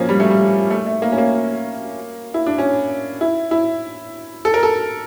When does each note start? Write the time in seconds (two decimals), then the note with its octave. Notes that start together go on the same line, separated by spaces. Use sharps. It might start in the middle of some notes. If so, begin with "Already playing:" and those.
Already playing: F3 A#3 C#4
0.09 G3
0.20 A3
0.30 G3
0.71 A3
0.86 A3
1.02 A#3
1.12 C#4
1.18 A#3
2.34 E4
2.46 D4
2.58 C#4
3.21 E4
3.51 E4
4.45 A4
4.54 A#4
4.63 A4